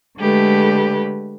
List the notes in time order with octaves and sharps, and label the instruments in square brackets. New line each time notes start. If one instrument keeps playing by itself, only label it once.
[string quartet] D3 G#3 A3 G4 B4